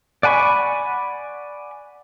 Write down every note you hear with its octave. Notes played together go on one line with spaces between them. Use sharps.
D5 F#5 G#5 B5 C#6